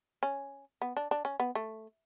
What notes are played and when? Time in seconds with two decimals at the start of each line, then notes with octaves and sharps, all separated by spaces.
0.23 C#4
0.82 B3
0.97 D4
1.11 D4
1.25 C#4
1.40 B3
1.55 A3